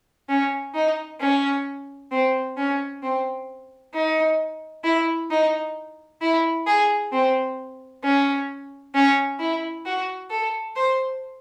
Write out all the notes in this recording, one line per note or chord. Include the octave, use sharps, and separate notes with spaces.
C#4
D#4
C#4
C4
C#4
C4
D#4
E4
D#4
E4
G#4
C4
C#4
C#4
E4
F#4
A4
C5